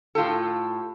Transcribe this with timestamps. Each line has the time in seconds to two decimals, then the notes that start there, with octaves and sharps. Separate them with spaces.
0.15 A2 F4 G4 A4